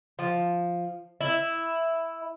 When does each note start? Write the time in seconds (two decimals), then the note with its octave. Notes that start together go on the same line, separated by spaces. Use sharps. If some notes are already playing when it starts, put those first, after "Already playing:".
0.19 F3
1.21 E4